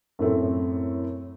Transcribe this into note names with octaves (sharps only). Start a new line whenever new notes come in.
F#2 A2 A3 C4